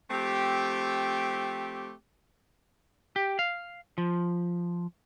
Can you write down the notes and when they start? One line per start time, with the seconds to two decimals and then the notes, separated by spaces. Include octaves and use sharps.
0.11 F3 A3 C4 G4
3.16 G4
3.39 F5
3.98 F3